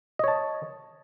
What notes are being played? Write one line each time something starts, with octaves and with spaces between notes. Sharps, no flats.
C#5 D#5 A5